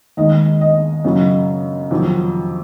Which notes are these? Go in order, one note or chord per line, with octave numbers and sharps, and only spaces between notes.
D#2 D#3 G#3 D#5
D#5
F#2 C#3 F#3
F2 C3 D#3 F#3